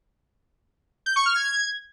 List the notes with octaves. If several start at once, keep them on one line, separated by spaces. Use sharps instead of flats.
G6
C#6
F6
G#6